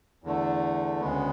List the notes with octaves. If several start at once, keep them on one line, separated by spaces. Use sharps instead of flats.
E2 D3 A3
D2 C#3 G#3 B3